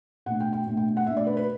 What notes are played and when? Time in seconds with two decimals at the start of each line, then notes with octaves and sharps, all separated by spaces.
0.26 B2 A3 D4 F#5
0.40 G5
0.53 G5
0.66 B2 A3 D4
0.77 G5
0.97 F#5
1.07 B2 A3 D4 E5
1.17 D5
1.27 B4
1.37 B4